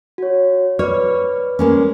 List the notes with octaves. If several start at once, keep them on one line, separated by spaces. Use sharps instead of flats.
F#4 C#5
B4 C#5 D5 F6
G#3 A#3 C#4